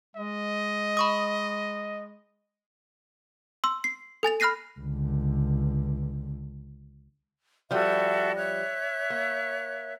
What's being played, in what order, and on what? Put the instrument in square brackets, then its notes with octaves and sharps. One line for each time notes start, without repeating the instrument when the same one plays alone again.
[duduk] G#3 [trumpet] D#5
[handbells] B5 C#6 D#6
[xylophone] C6 E6
C7
A4 G#5 A6 F7
B5 F6 F#6 A#6 C7 D#7
[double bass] C#2 D3
[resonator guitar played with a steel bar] F3 G3 [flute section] F#4 A4 E5
[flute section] C#5 E5 F#6
[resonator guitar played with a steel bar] A#3